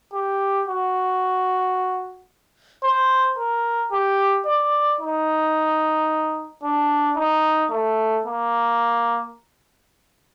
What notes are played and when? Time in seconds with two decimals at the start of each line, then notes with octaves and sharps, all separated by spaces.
0.14 G4
0.68 F#4
2.84 C5
3.38 A#4
3.92 G4
4.47 D5
5.01 D#4
6.63 D4
7.17 D#4
7.71 A3
8.25 A#3